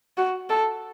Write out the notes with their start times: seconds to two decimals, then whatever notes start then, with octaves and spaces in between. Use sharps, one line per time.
0.17 F#4
0.50 A4